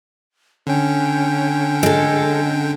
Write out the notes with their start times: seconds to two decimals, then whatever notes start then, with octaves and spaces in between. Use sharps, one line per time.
0.67 D3 C#4 G5
1.83 G#3 A4